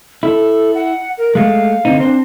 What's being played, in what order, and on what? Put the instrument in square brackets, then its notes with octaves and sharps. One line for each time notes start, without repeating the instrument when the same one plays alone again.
[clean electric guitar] E4 [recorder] A4
[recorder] F#5
A#4
[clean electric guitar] G#3 A3 [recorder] F5
[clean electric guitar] D3 C4 D#4
[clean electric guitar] C4 C5 [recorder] D4